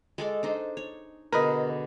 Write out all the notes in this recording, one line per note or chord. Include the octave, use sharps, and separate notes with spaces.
G#3 A4 D5
D4 D#4 C5
C#5
B2 D3 G#4 A#4 B4 D#5